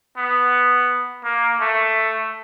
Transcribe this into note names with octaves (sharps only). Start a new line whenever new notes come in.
B3
A#3
A3